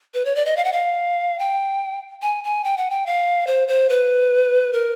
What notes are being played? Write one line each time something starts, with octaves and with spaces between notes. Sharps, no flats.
B4
C#5
D5
D#5
F5
F#5
F5
G5
G#5
G#5
G5
F#5
G5
F5
C5
C5
B4
A#4